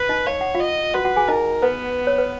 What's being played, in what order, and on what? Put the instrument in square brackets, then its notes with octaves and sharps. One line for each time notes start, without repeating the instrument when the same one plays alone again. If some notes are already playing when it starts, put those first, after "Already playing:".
Already playing: [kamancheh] B4
[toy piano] D#4 D#5
[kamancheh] C#5 [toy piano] F5
[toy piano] F#5
F4 F5
[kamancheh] D#5
[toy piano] F#4 F#5 [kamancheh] B4
[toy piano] F#4 F#5
G#4 G#5
[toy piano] D#4 D#5 [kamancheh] A#4
[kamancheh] B3 [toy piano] B4
[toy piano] C#5
B4